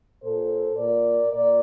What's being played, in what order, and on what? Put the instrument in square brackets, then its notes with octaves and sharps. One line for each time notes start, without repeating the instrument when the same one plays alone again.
[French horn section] A#2 A4 C5
A#2 A#4 D5
A#2 A#4 D5